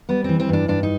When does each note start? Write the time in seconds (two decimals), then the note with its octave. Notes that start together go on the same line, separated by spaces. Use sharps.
0.09 G3 B3
0.24 E3 C4
0.40 C4
0.49 G2 D4
0.68 G2 D4
0.83 D#4